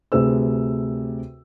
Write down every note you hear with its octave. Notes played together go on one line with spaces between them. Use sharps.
D2 C3 G#4 B4 E6